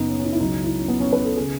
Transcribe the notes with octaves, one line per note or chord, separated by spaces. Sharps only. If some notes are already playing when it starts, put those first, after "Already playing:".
Already playing: F#1 F#2 C#3 B3 D#4
C#4
C#4
D#4
E4
C#2 C#3 F#3 D#4
E4
C#4
B3
C#4
B4
A4
C#3 G#4